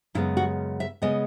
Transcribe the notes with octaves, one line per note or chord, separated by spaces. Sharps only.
F#2 C#3 G#3 B3 E4
F#4
E5
C#3 G#3 B3 D#5